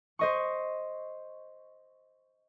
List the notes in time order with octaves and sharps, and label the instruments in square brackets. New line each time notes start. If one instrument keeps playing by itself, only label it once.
[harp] C5 D#5 C#6